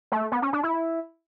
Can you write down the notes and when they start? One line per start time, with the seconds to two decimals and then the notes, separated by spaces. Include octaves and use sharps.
0.12 A3
0.32 B3
0.42 C#4
0.53 D4
0.63 E4